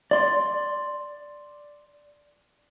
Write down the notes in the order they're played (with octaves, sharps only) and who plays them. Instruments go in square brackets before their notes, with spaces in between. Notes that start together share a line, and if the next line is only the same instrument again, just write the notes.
[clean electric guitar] D5 C6